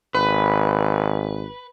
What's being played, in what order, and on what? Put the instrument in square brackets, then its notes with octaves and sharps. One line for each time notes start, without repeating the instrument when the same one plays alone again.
[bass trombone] G#1 [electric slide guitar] B4